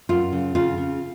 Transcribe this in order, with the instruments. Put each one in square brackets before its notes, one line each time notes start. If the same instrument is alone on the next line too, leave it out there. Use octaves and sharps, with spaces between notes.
[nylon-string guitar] F#2 F4
C#3
C#3 F4
C#3